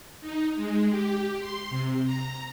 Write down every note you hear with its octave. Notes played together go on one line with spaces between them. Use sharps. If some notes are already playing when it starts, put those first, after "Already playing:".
D#4
G#3
G4
C6
C3
A#5